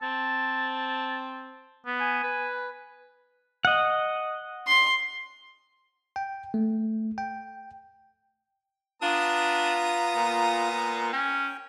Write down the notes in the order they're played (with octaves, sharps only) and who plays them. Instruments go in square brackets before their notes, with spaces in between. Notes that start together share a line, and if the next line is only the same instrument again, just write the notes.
[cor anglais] C4 [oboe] A5
[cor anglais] B3
[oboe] G#5
[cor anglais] B4
[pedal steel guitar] D#5 F#5
[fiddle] C6
[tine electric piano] G5
A3
G5
[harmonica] B3 A#5 D#6 [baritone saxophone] D4 [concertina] F4
[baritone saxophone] A#2
[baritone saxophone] C#4 [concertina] G5